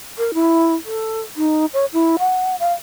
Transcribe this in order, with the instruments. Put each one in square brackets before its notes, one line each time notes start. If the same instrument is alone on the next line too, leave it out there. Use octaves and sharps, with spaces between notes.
[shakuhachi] A#4
E4
A4
D#4
C#5
E4
F#5
F5